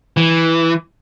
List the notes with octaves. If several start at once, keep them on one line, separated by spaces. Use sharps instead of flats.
E3